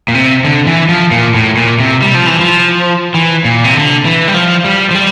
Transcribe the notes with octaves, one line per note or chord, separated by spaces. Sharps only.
A#2
C3
D3
E3
F3
A#2
A2
A#2
C3
G3
F3
E3
F3
E3
A#2
C3
D3
E3
G3
F3
G3
F3
G3